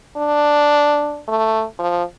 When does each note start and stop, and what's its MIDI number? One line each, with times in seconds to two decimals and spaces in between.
0.17 1.22 62
1.28 1.64 57
1.79 2.03 53